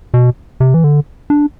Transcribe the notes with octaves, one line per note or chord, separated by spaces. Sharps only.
B2
C3
E3
D3
D4